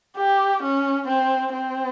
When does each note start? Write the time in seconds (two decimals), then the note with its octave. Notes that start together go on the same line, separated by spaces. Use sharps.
0.17 G4
0.62 C#4
1.08 C4
1.53 C4